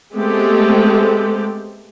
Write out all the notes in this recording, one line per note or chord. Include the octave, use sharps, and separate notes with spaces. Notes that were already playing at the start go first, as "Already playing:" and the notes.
G#3 A3 B3 C4 G4 A4